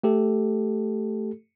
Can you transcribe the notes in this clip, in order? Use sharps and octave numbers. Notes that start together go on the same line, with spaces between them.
A3 G4 A4